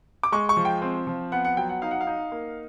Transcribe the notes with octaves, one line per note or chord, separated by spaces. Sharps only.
D6
G#3 C#6
C#6
F3
G5
C4
F3
B3 F#5
F#5
F#3 G5
F#5
D#4 F5
F#5
F5
D#4
A#3